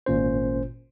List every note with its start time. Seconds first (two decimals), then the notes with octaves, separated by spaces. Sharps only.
0.06 G#1 A#2 C#4 C5